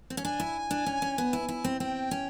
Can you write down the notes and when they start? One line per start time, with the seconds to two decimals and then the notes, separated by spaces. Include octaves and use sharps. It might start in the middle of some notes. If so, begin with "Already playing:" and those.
0.10 C4
0.17 C#4
0.24 D4 G#5
0.40 E4
0.71 D4
0.86 C#4
1.02 C#4
1.18 B3
1.33 E4
1.48 E4
1.64 C4
1.80 C4 G5
2.11 C#4